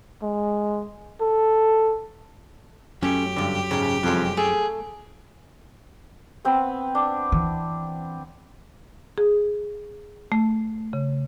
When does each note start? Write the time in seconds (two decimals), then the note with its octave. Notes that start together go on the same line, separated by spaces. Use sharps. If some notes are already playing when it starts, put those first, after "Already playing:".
0.23 G#3
1.21 A4
3.03 F#2 F#3 A3 C#4 G4
3.36 G2 D3
3.71 C#2 G#2 C#3
4.03 C2 F2 G#3
4.37 A3 G#4
6.45 B3 C4 B4
6.95 D4
7.32 E3
9.18 G#4
10.32 A3
10.93 C#3